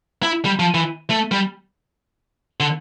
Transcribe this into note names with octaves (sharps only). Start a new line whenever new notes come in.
E4
G3
F3
E3
A3
G3
D3